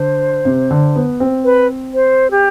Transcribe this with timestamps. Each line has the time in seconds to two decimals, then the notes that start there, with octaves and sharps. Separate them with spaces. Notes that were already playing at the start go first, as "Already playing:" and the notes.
Already playing: D3 C5
0.45 C3
0.71 D3
0.96 B3
1.20 C4
1.44 B4
1.94 C5
2.31 G4